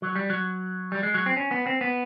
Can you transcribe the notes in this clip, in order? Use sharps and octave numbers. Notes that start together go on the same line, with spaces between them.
F#3
G3
F#3
G3
G#3
F#3
C4
C#4
B3
C4
B3